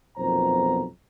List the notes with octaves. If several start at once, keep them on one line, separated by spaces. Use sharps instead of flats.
B1 F2 A#2 B3 C5 A#5